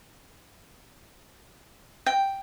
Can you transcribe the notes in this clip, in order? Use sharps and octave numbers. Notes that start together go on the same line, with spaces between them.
G5